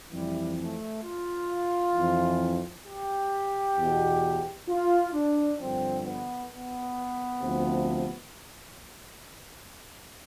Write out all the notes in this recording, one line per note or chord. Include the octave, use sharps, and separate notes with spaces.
F2 E3 G3
A3
F4
F2 E3
G4
E2 B2
F4
D4
G2 D3 F3 C4
B3
B3
D2 C3 F3